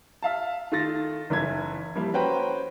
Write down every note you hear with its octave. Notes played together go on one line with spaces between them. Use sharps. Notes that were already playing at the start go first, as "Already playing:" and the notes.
E5 F5 A5
D#3 A3 F4 A4 A6 A#6
F#1 E3 E4 G#6
F3 G3 A#3 E4
C#4 F#4 B4 C5 G5 A#5